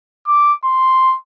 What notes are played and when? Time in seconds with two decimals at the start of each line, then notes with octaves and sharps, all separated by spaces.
0.27 D6
0.64 C6